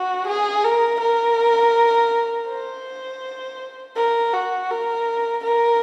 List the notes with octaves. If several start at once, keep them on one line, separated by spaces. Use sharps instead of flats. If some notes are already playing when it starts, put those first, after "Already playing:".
Already playing: F#4
G#4
A#4
A#4
C5
A#4
F#4
A#4
A#4